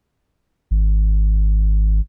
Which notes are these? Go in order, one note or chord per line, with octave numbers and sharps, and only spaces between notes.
G#1